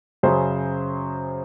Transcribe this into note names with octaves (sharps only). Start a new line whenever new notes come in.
F#2 C#3 F#3 G#4 C5